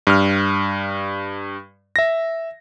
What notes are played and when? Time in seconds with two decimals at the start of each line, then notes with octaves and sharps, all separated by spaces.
0.07 G2 F6
1.96 E5 A#6